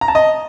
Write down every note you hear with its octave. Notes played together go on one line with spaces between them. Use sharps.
A#5
A5
D#5